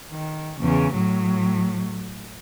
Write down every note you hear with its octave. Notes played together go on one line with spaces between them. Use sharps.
D#3
E2 C#3
A2 F#3